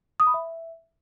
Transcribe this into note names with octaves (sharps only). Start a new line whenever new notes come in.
D#6
B5
E5